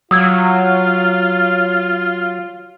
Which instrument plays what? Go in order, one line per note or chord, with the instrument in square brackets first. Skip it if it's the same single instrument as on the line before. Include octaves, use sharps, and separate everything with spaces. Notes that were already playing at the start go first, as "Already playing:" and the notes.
[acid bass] F#3 [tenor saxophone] F4 [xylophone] D#6 E6 G#6